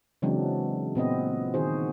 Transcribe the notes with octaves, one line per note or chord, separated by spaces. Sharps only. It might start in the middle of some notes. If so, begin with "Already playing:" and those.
C#3 E3 F#3 G#3 C4 D4
A#2 B3 C4 D#5
D#3 D#4 F#4 G#4 C5